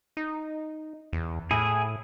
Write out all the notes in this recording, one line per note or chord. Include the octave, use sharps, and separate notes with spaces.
D#4
E2
A2 E4 G#4 G#5